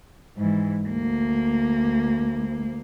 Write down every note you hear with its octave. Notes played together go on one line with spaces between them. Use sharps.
G#2 E3
D2 A#3